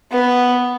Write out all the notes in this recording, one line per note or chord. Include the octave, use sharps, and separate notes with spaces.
B3